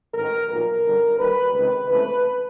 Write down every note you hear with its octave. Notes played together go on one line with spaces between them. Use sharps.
A1 G#2 D#3 A#4
B1 A#2 F3 A#4
G1 F#2 D3 G3
D#2 D#3 G3 B4
C#2 C3 D#3 B4
C#2 C3 E3 A3 B4